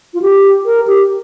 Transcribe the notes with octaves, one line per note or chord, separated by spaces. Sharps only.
F4
G4
A#4
G4